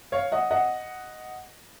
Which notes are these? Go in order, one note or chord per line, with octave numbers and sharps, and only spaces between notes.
C#5 F5
D#5 F#5
D#5 F#5